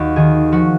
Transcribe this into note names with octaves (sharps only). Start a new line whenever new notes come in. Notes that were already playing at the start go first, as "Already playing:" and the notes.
Already playing: D#2 F#4
D#3 G#4
F3 F#4